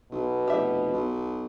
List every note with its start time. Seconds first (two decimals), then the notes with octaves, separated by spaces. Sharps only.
0.11 B1 B2
0.48 F1 G4 E5
0.93 B1